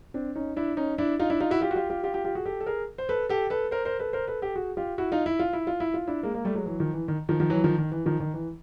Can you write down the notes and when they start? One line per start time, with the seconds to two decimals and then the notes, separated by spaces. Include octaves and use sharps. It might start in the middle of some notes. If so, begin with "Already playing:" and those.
0.14 C4 D4
0.36 C#4 D#4
0.56 D4 E4
0.77 C#4 D#4
0.98 D4 E4
1.19 D#4 F4
1.30 D4 E4
1.40 D#4 F4
1.51 E4 F#4
1.61 F4 G4
1.71 F#4
1.76 F4 G4
1.90 F4 G4
2.04 F4 G4
2.14 F4 G4
2.25 F4 G4
2.35 F#4 G#4
2.45 G4 A4
2.60 A4
2.66 G#4 A#4
2.98 C5
3.09 A4 B4
3.29 G4 A4
3.50 A4 B4
3.71 A#4 C5
3.85 A#4 C5
3.99 A4 B4
4.13 A#4 C5
4.28 A4 B4
4.42 G4 A4
4.56 F#4 G#4
4.77 F4 G4
4.98 E4 F#4
5.12 D#4 F4
5.26 E4
5.39 F4
5.53 E4
5.67 F4
5.80 E4
5.94 F4
6.07 D4 E4
6.23 G#3 A#3
6.34 G#3 A#3
6.45 G3 A3
6.55 F#3 G#3
6.66 E3 F#3
6.80 D#3 F3
6.93 E3
7.08 D#3
7.29 D#3 F3
7.40 D#3 F3
7.50 E3 F#3
7.64 D#3 F3
7.78 D#3
7.92 E3
8.06 D#3 F3
8.20 D#3
8.34 E3